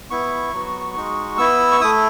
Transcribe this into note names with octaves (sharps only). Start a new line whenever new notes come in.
B3 E4 C#6
F#3 B3 F#4
G#3 D#4 F#4
B3 E4 E6
C#6
A3 E4 D#6